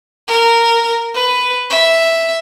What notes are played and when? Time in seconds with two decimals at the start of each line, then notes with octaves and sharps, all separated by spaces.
0.28 A#4
1.14 B4
1.70 E5